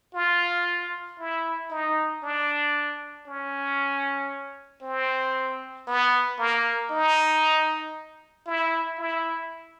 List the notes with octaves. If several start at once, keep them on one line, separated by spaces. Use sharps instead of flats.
F4
E4
D#4
D4
C#4
C4
B3
A#3
D#4
E4
E4